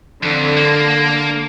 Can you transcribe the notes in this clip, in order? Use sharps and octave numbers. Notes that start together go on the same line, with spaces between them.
F2 D3
A#3